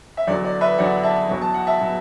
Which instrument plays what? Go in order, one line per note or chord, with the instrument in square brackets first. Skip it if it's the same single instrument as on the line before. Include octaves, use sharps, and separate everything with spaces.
[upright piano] E5
E2 D3 F#3 D5
D5
B4 E5
E2 D3 F#3 D5 F#5
E5 A5
E2 B2 F#3
A5
F#5
E5 A5
B2 F#3